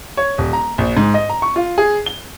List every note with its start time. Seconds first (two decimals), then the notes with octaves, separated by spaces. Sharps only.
0.17 C#5
0.38 D#1
0.53 A#5
0.78 A#1
0.97 G#2
1.14 D#5
1.30 A#5
1.42 C#6
1.56 F4
1.78 G#4
2.06 G7